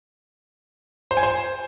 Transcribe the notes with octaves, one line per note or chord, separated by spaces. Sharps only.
C5
G#5
C5